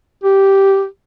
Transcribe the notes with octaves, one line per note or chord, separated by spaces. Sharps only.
G4